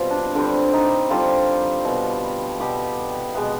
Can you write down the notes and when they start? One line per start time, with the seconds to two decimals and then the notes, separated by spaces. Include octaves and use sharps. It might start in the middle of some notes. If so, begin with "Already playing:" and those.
Already playing: B2 G3 C4 F4
0.10 D4
0.35 D3 G3 C4
0.73 D#4
1.10 D3 G3 C4 F4
1.85 B2 B3
2.60 B2 B3 G4
3.35 B2 G#3 B3